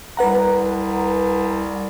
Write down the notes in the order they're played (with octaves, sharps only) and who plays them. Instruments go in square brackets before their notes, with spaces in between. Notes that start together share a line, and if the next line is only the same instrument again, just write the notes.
[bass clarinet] C2 [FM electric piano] B4 F#5 A#5